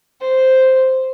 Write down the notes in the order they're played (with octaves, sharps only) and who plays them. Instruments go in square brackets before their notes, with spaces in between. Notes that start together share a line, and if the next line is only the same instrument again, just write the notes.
[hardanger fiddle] C5